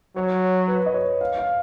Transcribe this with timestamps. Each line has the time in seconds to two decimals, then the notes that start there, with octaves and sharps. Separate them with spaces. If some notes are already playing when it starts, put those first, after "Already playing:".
0.16 F#3 C#5
0.68 B4
0.86 D#5
0.94 C#5
1.21 F5
1.38 F5